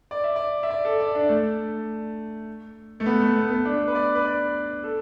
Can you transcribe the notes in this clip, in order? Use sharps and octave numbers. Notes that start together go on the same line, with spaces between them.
D5
E5
D5
E5
D5
A4
D5
D4
A3
A3
B3
A3
B3
B3
D4
B4
D5
B4
D5
A4